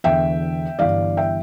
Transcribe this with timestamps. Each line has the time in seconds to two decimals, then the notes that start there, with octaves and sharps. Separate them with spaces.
0.04 E1 E2 D3 E5 G5
0.79 G1 G2 E3 D5 F5
1.17 E5 G5